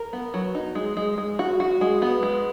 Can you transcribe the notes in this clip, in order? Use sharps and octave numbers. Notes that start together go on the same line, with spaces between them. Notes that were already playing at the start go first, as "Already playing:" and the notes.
Already playing: A#4
B3
F#3
D#4
G#3
G#3
G#3
F#4
F#4
G#3
B3
G#3